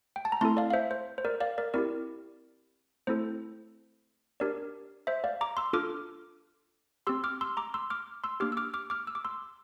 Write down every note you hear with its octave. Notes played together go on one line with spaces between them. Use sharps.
G5
A5
A#5
A3 C4 E4 A4 A5 C6
D5 F5
F5
C5 E5
C5
C5
A#4 D5
D5 F5
A#4 D5
C4 E4 G4 A#4 D5
A3 C4 E4 A4 C5
D4 G4 A#4 D5
C5 E5
D5 F5
A#5 D6
C6 E6
D4 F4 A4 D6 F6
C4 G4 C6 E6
D6 F6
C6 E6
A#5 D6
C6 E6
D6 F6
C6 E6
A#3 D4 G4 D6 F6
E6
D6 F6
D6 F6
D6 F6
E6
D6
C6 E6